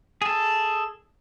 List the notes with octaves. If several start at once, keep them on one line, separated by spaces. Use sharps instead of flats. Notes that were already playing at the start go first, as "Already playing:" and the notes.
G#4 A4